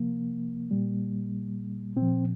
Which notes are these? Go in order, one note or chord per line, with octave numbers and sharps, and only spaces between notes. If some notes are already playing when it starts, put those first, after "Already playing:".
Already playing: C3 F3 A#3
A#2 G3
A#2 C4
F3